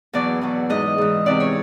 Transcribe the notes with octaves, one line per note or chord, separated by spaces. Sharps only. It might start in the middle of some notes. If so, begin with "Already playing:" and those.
E2 B2 F#3 D5
E2 B2 F#3
G#2 E3 D#5
G#2 E3
E2 C3 E3 D5
C#5